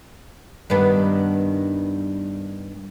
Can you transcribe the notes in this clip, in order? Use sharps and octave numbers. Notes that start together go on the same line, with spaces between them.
G2 D#3 B3